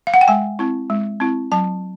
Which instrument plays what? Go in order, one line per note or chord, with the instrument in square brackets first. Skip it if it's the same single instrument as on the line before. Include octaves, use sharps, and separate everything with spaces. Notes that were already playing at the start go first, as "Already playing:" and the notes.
[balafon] F5
F#5
G5
G#3 G#5
C4 E4
G#3
C4 E4
F#3 A5